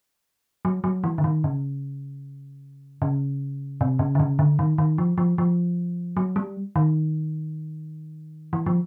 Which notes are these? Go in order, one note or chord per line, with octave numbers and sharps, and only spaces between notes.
F#3
F#3
E3
D3
D#3
C#3
C#3
C3
C#3
D3
C#3
D3
D#3
D#3
F3
F3
F3
F#3
G3
D#3
E3
F3